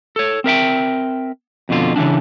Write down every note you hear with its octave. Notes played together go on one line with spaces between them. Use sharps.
A4 C#5
C4 A#4 E5 G5
F2 B2 D3 F4
C#3 E3 A#3 C4 D4